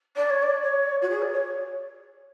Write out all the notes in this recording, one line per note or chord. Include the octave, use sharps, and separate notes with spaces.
D5
C#5
D5
C#5
F#4
G#4
D5
C#5